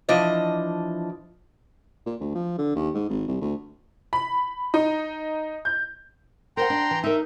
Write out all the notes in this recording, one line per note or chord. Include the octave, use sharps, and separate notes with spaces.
E3 F3 D4 D#5
A#2
D2
F3
D3
D#2
G#2
G#1
C2
D2
B5
D#4
G6
A#4 C5 F#5 G5 A#5 C6
D4
E3
D#4 A#4 E5